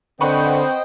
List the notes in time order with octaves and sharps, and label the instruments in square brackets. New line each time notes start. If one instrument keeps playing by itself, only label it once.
[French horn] D3 [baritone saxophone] C4 [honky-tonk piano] B4 F#5 C#6 [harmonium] C5 D#5 G5